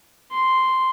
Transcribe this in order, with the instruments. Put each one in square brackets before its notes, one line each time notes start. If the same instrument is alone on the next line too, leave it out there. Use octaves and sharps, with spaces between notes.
[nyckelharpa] C6